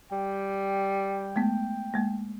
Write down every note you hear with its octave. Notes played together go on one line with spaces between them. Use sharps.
G3 G5
G#3 A3 B3
G#3 A#3